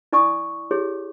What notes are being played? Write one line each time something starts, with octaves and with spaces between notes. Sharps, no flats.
E4 D5 G#5 C#6 D#6
E4 G4 G#4 C#5